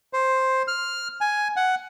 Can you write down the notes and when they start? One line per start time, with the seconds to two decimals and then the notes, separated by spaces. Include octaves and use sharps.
0.13 C5
0.68 F6
1.21 G#5
1.56 F#5